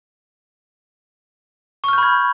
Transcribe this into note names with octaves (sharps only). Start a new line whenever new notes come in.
B5 C#6 F6 G6 G#6